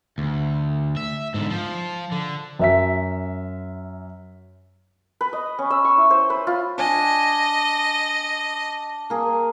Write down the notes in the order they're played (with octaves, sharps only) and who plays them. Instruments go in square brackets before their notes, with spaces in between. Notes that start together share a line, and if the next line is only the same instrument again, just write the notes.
[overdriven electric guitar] D2
E5
G#2 D3
F3
D3
[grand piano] F#2 E5 B6
[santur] B4
D#5
C#4
E6
C#6
E4
C5
B4
F4
[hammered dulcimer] D4 G#5 [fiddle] D#5
[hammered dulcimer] A#3 G#4